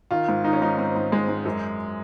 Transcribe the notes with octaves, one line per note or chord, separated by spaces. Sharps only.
D#3 F4
G#2
D#3 D#4
C#4
G#2 D#4
G#2 C4
G#2
G#2 G#3
G#2
F#2